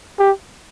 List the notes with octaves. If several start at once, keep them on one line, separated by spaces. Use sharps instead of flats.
G4